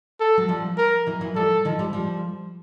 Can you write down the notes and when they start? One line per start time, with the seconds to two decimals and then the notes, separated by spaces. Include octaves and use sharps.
0.20 A4
0.37 F#3
0.49 F3 G3
0.78 A#4
1.07 E3 F#3
1.21 E3 F#3
1.36 F3 G3 A4
1.65 D#3 F3
1.79 F3 G3
1.93 F3 G3